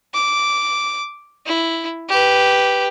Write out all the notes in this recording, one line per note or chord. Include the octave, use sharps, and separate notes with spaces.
D6
E4
G4 B4